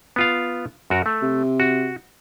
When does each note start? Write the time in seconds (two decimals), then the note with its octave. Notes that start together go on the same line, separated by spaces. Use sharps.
0.16 B3 F4 F5
0.90 F#2 F#4 A#4
1.06 A3
1.22 C3
1.60 F#4